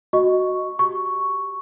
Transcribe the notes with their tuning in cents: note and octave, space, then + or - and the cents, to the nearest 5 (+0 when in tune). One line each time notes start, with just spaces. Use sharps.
F#4 +0 D#5 +0 C#6 +0
G4 +0 C#6 +0